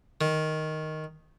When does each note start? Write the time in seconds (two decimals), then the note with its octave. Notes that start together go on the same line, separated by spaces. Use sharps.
0.21 D#3